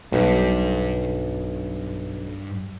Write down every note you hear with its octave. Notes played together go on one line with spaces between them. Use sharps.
B1 G2